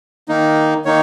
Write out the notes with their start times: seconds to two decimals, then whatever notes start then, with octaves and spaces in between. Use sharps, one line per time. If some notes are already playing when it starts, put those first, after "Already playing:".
0.29 D#3 A#3 D#4
0.85 D#3 A#3 D#4 C#5